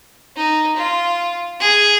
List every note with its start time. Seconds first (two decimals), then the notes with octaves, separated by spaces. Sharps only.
0.36 D#4
0.77 F4
1.60 G#4